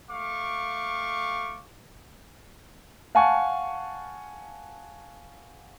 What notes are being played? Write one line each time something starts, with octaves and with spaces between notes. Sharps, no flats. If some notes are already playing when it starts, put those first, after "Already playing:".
A3 F5 C#6 D6
F5 F#5 G#5 A5 C#6